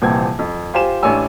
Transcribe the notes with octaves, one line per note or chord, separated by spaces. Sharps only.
D#1 A#1 C3 E3 C4 G#6
F2
F4 G4 C5 G#5 E7
A1 D4 G4 C#5 G#5 E6